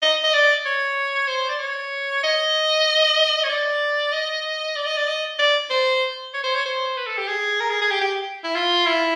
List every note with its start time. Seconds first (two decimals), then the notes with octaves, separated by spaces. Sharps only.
0.02 D#5
0.23 D#5
0.34 D5
0.65 C#5
1.28 C5
1.49 D5
1.59 C#5
2.23 D#5
3.43 C#5
3.49 D5
4.12 D#5
4.76 D5
4.86 D#5
4.97 D5
5.08 D#5
5.39 D5
5.70 C5
6.34 C#5
6.44 C5
6.55 C#5
6.65 C5
6.97 B4
7.07 A4
7.18 G4
7.28 G#4
7.60 A#4
7.70 G#4
7.81 G#4
7.91 G4
8.01 G4
8.44 E4
8.55 F4
8.86 E4